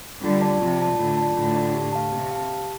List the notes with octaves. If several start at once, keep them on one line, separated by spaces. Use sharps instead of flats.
D3 G3 F4
D5 A5
C3 F3 F4
D5 A5
A2 D3 F4
D5 A5
A2 D3 F4
D5 A5
G4
F5 A5
C3 G4
F5 A5
G4